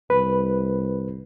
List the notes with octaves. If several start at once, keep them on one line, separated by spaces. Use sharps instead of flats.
C2 B4